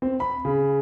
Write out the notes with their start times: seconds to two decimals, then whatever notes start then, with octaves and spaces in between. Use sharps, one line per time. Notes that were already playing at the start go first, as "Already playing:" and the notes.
0.02 C4
0.20 B5
0.45 C#3